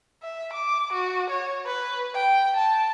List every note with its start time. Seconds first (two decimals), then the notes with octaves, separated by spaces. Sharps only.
0.23 E5
0.53 D6
0.92 F#4
1.30 C#5
1.66 B4
2.15 G5
2.57 A5